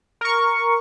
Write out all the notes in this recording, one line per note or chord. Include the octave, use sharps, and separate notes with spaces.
A#4 C#6